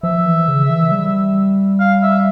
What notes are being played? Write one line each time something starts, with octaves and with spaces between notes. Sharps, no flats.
F3 E5
E3
C#3
E3
G3
F5
E5